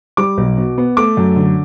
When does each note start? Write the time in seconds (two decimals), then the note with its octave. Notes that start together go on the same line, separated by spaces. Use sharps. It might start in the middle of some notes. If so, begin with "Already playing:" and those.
0.17 G3 D6
0.38 B1
0.57 B2
0.78 B3
0.97 A3 D6
1.17 F#2
1.36 D3